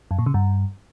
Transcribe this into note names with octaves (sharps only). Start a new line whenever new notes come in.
F#2
A#2
C#3
G2